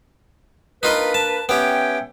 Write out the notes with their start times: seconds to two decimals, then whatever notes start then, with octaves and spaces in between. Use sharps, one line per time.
0.83 A#3 D4 D#4 F4 B4 D#5
1.14 A5
1.49 B3 C#4 G4 E5 G5